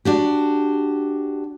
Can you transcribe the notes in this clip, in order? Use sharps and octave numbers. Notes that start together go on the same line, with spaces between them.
D4 F#4 G4